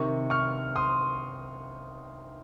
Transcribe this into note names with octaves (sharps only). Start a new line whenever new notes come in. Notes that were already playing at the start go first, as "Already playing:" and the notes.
Already playing: C3 D#3 C#6
C#6 F6
C6 D#6